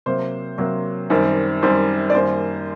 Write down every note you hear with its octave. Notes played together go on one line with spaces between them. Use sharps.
C3 F#3 A#3 C5
C3 F#3 A#3
F#2 D#3 G3 C4
F#2 D#3 G3 C4 C5
D5
F#2 D#3 G3 A#3 C5